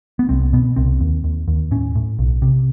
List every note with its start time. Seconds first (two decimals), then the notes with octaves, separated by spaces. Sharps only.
0.19 B3
0.29 C2 C4
0.53 B2 B3
0.76 C2 C4
1.01 D#2
1.24 D#2
1.48 D#2
1.71 A2 C#4
1.95 A2
2.19 B1
2.42 C3